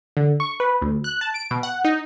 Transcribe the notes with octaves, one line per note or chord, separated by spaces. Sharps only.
D3
C#6
B4
D2
F#6
A5
D7
B2
F#5
D#4